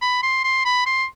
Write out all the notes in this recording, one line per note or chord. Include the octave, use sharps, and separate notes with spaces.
B5
C6
C6
B5
C6